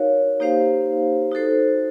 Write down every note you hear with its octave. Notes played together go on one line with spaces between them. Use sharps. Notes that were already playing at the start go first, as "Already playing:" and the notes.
Already playing: D#4 F#4 A#4 C#5 F5
A#3 D#4 G4 C5 F5
D#4 F#4 A4 C5